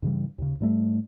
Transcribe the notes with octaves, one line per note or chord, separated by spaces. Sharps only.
G2 C#3 E3 G3
D#2 C#3
G#2 G3 A3